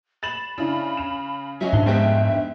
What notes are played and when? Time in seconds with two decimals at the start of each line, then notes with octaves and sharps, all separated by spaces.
0.23 B5 A6 E7 F#7
0.58 C#3 D4 E4
0.97 E7
1.61 F#3 C#4 D#5 E5
1.73 G#2 D4 C5 G7
1.86 F1 G#3 B3 C5 E5 G5